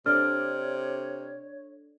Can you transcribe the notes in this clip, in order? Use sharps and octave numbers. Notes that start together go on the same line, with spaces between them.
C3 D4 A4 C#5 D5 F6